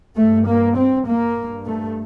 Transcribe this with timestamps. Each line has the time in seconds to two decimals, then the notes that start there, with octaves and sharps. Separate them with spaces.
0.16 G2 A3
0.47 A#3
0.76 C4
1.06 A#3
1.36 G2
1.66 A3